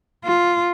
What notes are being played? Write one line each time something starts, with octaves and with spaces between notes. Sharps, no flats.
F4